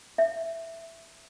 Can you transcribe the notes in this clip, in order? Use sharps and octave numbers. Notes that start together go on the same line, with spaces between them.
E5